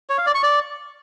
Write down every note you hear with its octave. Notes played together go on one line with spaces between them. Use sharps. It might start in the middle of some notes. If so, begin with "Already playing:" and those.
C#5
F5
D5
C#6
D5